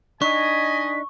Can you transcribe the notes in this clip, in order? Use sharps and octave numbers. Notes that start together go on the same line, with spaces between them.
D4 D#4 D#5 G#5 C#6 B6